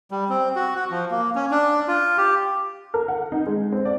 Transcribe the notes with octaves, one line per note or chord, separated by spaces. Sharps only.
G3
C4
F#4
F#4
F3
A#3
C#4
D4
F4
G4
A#4
F#5
D#4
G#3
C4
D5